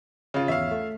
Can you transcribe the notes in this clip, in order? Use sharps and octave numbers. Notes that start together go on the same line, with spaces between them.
C#3 F4
G#1 E2 C#5 E5 F5
A3